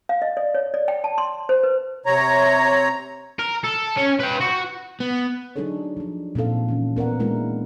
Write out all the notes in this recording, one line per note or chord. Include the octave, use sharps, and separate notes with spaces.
F5
D#5
D5
C#5
D5
G5
A5
C6
C5
B4
C3 C#5 A#5
A#4
A4
C#4
B4 G5
F#4
B3
F#3 D4 D#4 G#4 A4 C#5
F3 D4
A#2 C4 D#4 A4 F5
E3 C#4
B3 A#4 D5 F#5
G#3 A#3 D4 E4 A#4